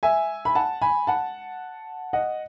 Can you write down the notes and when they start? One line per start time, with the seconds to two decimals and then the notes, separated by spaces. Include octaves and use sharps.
0.03 E5 G#5
0.45 B5
0.55 F#5 A5
0.82 G#5 B5
1.07 F#5 A5
2.13 D#5 F#5